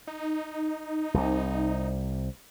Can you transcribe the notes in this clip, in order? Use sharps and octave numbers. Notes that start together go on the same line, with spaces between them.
D#4
C2 C3